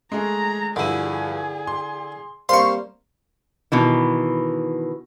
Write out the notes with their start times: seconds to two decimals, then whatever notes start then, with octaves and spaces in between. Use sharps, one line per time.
0.12 G#3 A3 G#4 A#5
0.76 G2 D3 F3 E4 G#4 D#7
1.67 C6
2.49 G3 A#3 C4 C5 F5 C6 C#6
3.72 B2 D#3 E3